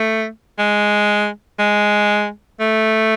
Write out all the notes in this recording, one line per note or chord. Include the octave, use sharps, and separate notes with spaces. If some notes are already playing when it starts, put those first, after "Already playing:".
Already playing: A3
G#3
G#3
A3